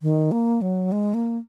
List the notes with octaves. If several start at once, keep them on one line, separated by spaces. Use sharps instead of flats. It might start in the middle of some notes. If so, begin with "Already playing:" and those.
D#3
A#3
F#3
G#3
A#3